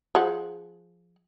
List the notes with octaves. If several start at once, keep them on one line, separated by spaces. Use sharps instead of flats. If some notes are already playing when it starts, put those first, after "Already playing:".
F3 G#4 F#5